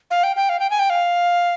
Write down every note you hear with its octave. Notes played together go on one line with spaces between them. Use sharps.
F5
G5
G5
F5
G5
G#5
G5
F5